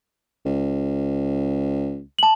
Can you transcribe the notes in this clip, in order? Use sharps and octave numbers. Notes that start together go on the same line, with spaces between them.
C#2
A5 F#7